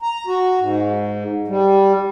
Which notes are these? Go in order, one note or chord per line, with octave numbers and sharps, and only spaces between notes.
A#5
F#4
G#2
G3